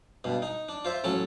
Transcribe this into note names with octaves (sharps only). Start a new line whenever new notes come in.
G2 B2
D#4
D4
F4 C5 E5
A1 F#3 C#4 A4